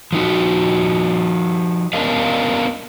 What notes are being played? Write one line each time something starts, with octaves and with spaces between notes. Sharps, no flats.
F3 D#4 F#4
B3 C#4 D4 A#4 D#5 F5